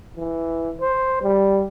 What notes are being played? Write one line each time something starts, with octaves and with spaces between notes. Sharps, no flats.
E3
C5
G3